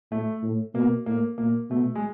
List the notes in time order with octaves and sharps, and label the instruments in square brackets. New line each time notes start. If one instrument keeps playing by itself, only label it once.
[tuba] A2 [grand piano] A3
[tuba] A2
[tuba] B2 [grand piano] A#3
[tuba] A2 [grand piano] A#3
[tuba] A#2 [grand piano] A#3
[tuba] B2 [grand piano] A3
[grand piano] G#3